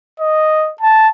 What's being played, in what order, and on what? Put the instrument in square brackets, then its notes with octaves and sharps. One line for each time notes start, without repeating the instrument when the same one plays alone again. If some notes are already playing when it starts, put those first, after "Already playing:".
[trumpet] D#5
A5